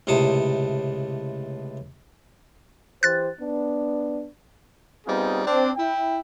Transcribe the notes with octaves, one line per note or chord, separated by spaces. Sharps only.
C#2 A2 C3 A4 A5 D#6
E3 G4 C5 F#6 A6
B3 D4
G3 B3 C4 D#4 F4 G#4
C4 D4
E4 G5